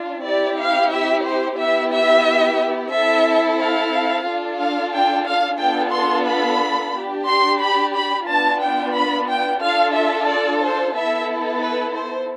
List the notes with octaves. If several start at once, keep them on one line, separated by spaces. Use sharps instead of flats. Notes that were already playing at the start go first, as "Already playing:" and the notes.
Already playing: D4 F4
C4 E4 G4 D5
F5
E5
C5
B3 E4 G4 E5
E5
C4 E4 A4 E5
F5
D4 F4 A4
F5
G5
F5
B3 D4 F4 A4 G5
C6
B5
D4 G4
C6
B5
B5
B3 D4 F4 A5
G5
B5
G5
D4 F4 A4 F5
E5
D5
C5
B3 E4 A4 E5
B4
C5